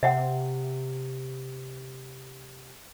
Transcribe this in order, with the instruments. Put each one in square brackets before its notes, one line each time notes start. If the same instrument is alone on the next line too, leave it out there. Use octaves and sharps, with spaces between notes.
[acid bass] C3 [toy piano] E5 F#5 G5